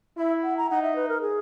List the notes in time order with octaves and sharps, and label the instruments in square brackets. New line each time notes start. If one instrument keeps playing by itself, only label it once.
[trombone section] E4 [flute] E5
[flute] F#5
A#5
[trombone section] D#4 [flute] F#5
[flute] E5
B4
A#4
G#4